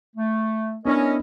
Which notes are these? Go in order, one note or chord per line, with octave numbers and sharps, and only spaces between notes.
A3
B3 C#4 D4 E4 A#4 D#5